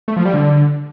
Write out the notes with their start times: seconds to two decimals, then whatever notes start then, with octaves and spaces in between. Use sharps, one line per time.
0.08 A3
0.17 F3
0.25 G3
0.34 D3